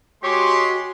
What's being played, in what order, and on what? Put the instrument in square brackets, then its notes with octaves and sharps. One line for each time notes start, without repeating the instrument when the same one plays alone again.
[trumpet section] G#3 C6 [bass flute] F#4 [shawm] G4 [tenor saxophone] C#5